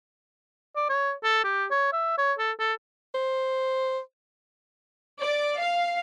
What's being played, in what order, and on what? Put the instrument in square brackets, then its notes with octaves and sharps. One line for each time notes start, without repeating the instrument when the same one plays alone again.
[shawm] D5
C#5
A4
G4
C#5
E5
C#5
A4
A4
[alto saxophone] C5
[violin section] D5
F5